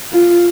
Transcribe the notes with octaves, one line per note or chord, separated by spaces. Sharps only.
F4